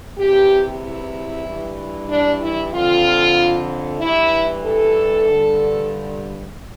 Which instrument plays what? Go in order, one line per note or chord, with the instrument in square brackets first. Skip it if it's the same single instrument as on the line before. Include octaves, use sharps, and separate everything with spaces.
[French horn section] E2 C3 E3 G4
E4
G2 E3
D4
E4
F2 D3 F4
G2 E3 E4
A4
G2 D3